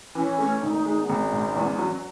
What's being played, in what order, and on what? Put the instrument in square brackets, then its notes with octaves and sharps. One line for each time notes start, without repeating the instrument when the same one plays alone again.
[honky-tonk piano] E3 [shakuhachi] C#4
[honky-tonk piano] A3 [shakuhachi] C#4
[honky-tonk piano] G#1 [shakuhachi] D#4
[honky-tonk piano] G#3 [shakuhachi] D#4
[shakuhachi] B3
[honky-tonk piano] G#1 [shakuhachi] C#4
[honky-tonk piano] G#2
E2
F#3